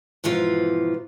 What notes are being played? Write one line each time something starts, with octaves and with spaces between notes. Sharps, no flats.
G#2 B2 E3 F3 F4